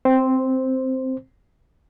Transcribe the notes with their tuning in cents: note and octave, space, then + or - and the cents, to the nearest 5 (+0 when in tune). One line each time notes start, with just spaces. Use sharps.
C4 +0 C5 +0